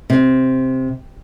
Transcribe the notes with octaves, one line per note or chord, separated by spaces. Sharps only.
C3